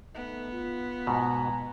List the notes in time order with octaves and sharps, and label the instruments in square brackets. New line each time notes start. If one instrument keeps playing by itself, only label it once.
[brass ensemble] A3 D#4 [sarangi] B3
[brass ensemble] F4
[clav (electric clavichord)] G#2 B2 [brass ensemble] G#5 A#5